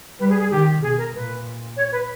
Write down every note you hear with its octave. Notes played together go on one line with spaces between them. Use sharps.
G3 B4
G#4
G#4
D#3 G4
B2 G#4
A#4
A#2 B4
C#5
B4